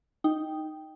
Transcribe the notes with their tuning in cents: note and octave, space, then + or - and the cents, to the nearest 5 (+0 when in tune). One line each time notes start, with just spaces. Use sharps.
D#4 +0 G5 +0